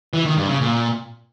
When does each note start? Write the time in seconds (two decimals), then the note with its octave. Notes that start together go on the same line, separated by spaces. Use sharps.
0.13 E3
0.25 D#3
0.37 G2
0.49 C#3
0.61 A#2